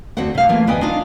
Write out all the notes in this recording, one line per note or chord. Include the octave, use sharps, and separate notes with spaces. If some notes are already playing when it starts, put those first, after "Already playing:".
D2 C4 F#4 C5 F#5
C3 F5
E3 A3 A#3 C4 F4
D2 B3 B4 D#5 G5 G#5
D4 D#4 F4 F5